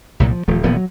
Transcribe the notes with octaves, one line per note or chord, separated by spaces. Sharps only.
C2 A#2 F#3
F3
D#1 F3 A3
D#1 A#2 F3 B3
F#3